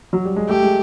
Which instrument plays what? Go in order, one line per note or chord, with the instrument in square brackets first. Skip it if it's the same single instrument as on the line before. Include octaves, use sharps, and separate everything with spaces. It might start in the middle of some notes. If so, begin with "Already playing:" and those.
[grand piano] F#3
G3
G#3
[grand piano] A3 [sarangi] G4
[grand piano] G#3